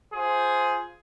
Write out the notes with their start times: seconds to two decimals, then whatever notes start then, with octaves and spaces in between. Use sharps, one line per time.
0.14 F4 G#4 C5